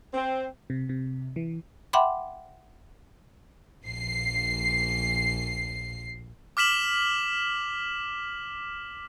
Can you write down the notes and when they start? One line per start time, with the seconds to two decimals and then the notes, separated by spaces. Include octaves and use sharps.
0.13 C4
0.70 C3
0.89 C3
1.36 E3
1.93 E5 F#5 G5 B5 C6 D6
3.84 A#1 C7
6.57 D6 F6 B6 E7 F#7